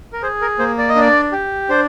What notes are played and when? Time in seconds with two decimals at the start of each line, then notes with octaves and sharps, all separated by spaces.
0.13 A#4
0.22 G#4 C5
0.41 A#4
0.59 A#3 C5
0.78 D5
0.89 D#5
0.95 D4 D5
1.32 G4
1.69 D4 C5